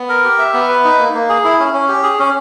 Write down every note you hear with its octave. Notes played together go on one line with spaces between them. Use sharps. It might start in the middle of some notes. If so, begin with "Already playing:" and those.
Already playing: B3
A#4
G4
E5
B3
B4
D#4
A#3
A#3
G#4
E4
C#4
C#4
G4
G#4
C#4